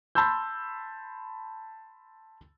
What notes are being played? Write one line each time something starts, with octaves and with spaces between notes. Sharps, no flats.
A5 B5 C6 E6 G6